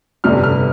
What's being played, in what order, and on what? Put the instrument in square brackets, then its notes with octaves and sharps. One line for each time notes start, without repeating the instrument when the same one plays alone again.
[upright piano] G1 F2 C3 G3 F6
F6